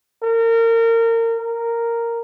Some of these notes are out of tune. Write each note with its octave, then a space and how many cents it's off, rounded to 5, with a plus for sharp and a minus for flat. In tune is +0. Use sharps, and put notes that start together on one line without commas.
A#4 -30
A#4 -5